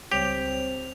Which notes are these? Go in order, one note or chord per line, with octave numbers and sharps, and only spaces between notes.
C#2 G3 C4 G4 C#5 F7